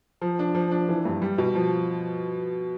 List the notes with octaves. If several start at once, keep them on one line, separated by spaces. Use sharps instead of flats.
F3
D4
F3
D4
E3
G2
G3
B2
F3